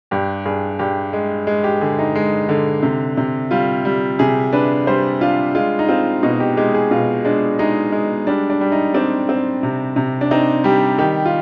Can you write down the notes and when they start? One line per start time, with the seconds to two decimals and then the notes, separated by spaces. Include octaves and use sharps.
0.11 G2 G4
0.45 G2 G#4
0.79 G2 G4
1.13 G#3
1.47 G#3
1.64 G4
1.81 D3 G#4
1.99 D#4
2.15 G#3
2.49 D3
2.83 C3
3.17 C3
3.51 G3 F4
3.85 G3
4.19 C3 G#4
4.53 D4 B4
4.87 G3 C5
5.21 D4 F4
5.55 G#3 F4
5.79 D#4
5.88 C4 F4
6.23 B2 D#4
6.40 G4
6.57 G#3 G4
6.74 G#4
6.91 B2 F4
7.25 G#3 D4
7.59 G#3 D#4
7.92 G#3
8.27 G3 D4
8.50 D4
8.61 G3
8.72 D#4
8.94 C4 D4
9.29 C4
9.63 C3
9.96 C3
10.21 D4
10.31 C4 D#4
10.64 G3 G4
10.98 D#3 G4
11.25 F4